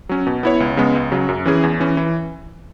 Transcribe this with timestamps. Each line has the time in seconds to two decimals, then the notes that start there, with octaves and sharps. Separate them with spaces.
0.09 F#3 C#4
0.27 B2
0.43 B3 E4 C#5
0.60 C#2
0.77 C#3 G#3 B3
0.95 C#2
1.12 C#3 F#3
1.29 F#2
1.45 E3 C#4 G#4
1.63 E2
1.80 E3 C#4
1.97 E3